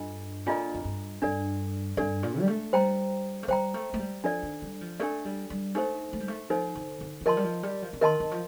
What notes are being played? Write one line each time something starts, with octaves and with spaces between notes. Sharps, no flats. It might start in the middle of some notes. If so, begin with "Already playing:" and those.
Already playing: G2 D4 F4 A4 D#5
A#2 D4 F4 A4 D#5 A#5
F2
G2
G2 D4 A4 D5
G2 D4 A4 D5
A#2
G3
A3
G3 C5 G5 A#5
A3
G3 C5 G5 A#5
A3
A3
G3
F3 D4 A4 D5
D#3
G3
F3
A3 D4 A4 D5
G3
G3
A3 D#4 A4 C5
A3
G3
A3
F3 D#4 A4 C5
D3
D3
D#3
F3 A#4 D#5 A5 C6
G3
F3
G3
F3
D3
D#3 A#4 D#5 A5 C6
D#3
F3